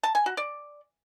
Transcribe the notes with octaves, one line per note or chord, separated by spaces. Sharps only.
A5
G#5
F#4
D5